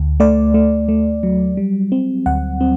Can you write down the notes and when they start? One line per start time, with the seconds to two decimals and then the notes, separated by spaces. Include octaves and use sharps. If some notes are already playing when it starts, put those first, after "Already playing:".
Already playing: D2
0.20 A3 D5
0.54 A3
0.89 A3
1.23 F#3
1.57 G3
1.92 C4
2.26 D2 F#5
2.61 C4